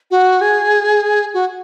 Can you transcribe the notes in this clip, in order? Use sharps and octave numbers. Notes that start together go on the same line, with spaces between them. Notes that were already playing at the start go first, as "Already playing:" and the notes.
F#4
G#4
F#4